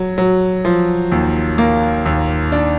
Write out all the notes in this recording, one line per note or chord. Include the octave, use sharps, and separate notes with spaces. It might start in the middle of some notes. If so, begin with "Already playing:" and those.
Already playing: F#3
F#3
F3
D#2
A#3
D#2
D4